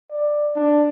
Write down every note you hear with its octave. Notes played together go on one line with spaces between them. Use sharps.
D5
D4